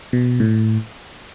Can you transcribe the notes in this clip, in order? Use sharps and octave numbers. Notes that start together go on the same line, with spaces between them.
B2
A2